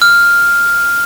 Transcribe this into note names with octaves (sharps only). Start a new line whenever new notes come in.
F6